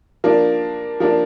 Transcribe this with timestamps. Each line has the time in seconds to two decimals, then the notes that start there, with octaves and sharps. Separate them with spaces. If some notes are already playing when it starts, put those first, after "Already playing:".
0.24 F3 A#3 D4
1.00 F3 A#3 D4